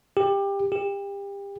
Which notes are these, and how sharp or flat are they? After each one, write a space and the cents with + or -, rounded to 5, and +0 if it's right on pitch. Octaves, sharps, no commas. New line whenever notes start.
G4 +20
G4 +30